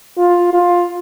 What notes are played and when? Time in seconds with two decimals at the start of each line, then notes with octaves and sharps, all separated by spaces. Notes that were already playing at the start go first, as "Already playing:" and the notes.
0.18 F4
0.53 F4